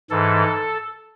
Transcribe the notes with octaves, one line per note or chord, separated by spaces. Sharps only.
G#2 E3 A4